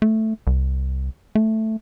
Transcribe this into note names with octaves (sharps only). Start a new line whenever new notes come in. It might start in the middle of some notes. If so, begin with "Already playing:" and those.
A3
C2
A3